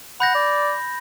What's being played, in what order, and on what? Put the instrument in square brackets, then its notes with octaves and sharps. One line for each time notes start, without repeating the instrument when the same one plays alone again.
[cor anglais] F#5 [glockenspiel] B5 G6 A#6
[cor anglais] D5